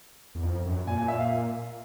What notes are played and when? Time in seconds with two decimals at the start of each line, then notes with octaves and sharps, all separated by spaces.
0.35 E2
0.43 F2
0.65 F#2
0.87 A#2 G#5
0.98 G#5
1.08 E5
1.20 F5